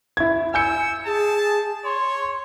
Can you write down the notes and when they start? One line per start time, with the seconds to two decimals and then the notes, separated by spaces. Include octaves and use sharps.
0.17 E4 G#6
0.54 G#5 E6 G6 C#7
1.06 G#4 A5
1.85 C#5 C6